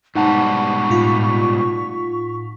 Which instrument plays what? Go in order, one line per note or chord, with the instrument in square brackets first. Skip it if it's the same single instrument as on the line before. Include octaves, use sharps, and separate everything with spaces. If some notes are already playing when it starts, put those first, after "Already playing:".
[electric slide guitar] G#2 B2 G3 [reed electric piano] D#4 F#5 A5 [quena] C#6
[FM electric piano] A2 F4 B6